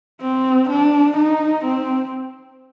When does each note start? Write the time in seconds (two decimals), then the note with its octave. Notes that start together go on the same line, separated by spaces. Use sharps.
0.22 C4
0.70 D4
1.17 D#4
1.65 C4